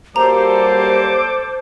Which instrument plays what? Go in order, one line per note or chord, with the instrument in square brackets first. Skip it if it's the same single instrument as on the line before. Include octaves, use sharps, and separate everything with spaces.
[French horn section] F#3 G3 A#3 [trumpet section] A4 D6 [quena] C5 [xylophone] A#5